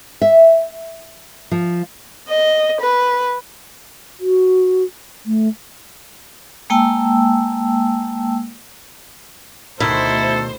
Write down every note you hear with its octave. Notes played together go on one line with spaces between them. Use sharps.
E5
F3
D#5
B4
F#4
A3
G#3 A#3 G5 A5 E6
D2 B2 D#3 E4 A4 C5